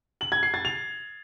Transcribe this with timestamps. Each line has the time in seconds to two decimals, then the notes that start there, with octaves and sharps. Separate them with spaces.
0.21 F#7
0.32 G#6
0.43 C7
0.54 A6
0.65 F7